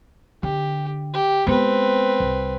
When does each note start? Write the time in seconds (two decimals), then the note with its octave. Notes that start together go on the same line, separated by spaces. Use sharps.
0.43 D3 G4
1.14 G4
1.47 G#3 B3 C4 B4
2.20 C2